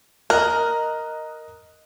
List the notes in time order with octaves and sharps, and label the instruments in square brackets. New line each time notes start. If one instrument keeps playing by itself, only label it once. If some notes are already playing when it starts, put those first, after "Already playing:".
[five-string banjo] A#4 [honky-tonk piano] D#5 F6 F#6